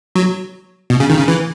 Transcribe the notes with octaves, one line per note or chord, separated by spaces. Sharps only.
F#3
B2
C#3
D#3
C#3
E3